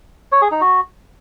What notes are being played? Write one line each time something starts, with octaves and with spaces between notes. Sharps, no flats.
C#5
G#4
D#4
F#4